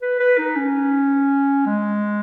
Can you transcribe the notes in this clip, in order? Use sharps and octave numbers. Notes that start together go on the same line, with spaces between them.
B4
B4
D#4
C#4
G#3